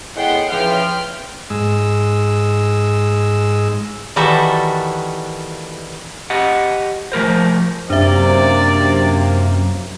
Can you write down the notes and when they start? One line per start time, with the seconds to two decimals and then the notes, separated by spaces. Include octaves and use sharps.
0.16 A2 G#3 B3 F#5 G5 C6
0.51 C#3 E3 F3 B4 G5 F6
1.50 G#2 G#3 E6
4.16 D#3 E3 G3 F#4 A4 E5
6.30 G4 D#5 F#5
7.12 F3 A3 A#4 C5
7.90 F#2 C3 A#3 D4 D5 E5